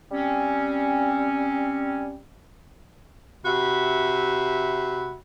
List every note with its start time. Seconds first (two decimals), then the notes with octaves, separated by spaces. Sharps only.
0.12 G3 C4 C#4
3.45 C3 F#4 E5 B5